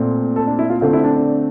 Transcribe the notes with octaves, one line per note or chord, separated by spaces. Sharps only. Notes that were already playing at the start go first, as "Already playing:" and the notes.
Already playing: A#2 A3 C4
A4
D4
E4
F4
D3 A3 C4 F4
E4
D4
D4